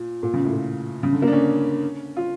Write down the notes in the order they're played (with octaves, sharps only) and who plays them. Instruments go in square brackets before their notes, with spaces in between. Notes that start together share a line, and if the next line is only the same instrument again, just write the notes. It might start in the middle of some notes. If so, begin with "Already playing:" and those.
Already playing: [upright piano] A#2
A#2
C#3
A2
A#2
C#3
D3
A#3
D4
C#4
F4